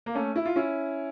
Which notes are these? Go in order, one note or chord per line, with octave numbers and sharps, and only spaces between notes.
A#3
A3 C#4
E4
F4
C#4 E4